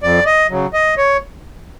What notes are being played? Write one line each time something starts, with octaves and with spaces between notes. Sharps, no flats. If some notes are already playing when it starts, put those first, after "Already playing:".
F2 D5
D#5
C#3 F#3
D#5
C#5